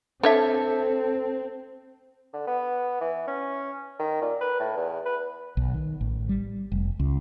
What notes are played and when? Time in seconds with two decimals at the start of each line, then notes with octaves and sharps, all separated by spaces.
0.23 C4 D4 A4 C#5 E5
2.33 D3
2.47 B3
3.00 E3
3.27 C#4
3.99 D#3
4.21 A#2
4.41 B4
4.60 A2
4.76 E2
5.05 B4
5.57 B1
5.74 D#3
6.01 A1
6.29 G3
6.72 F1
7.00 C#2